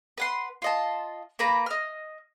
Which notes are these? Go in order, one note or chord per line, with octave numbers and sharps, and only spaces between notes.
B4 F#5 C6
F4 D#5 A5
A#3 B4 A#5 B5
D#5 F6